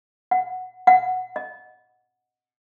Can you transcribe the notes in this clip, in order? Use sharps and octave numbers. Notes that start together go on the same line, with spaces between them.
F#5
F#5
D#5